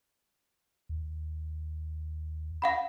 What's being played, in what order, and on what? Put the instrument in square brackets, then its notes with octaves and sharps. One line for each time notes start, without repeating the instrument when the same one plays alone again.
[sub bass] D#2
[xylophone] F5 F#5 B5